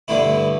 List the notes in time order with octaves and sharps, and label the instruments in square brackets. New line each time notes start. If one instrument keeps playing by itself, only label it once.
[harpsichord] G2 D3 A3 E4